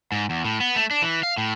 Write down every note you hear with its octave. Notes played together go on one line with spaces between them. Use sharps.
G#2
E2
A2
B3
A3
D4
E3
F5
A2